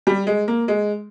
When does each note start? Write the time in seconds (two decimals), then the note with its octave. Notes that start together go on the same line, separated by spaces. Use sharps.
0.07 G3
0.27 G#3
0.48 A#3
0.68 G#3